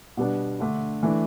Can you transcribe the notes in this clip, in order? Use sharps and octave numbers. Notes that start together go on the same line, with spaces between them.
B2 G3 B3 D4
D3 A3 D4
E3 A3 D4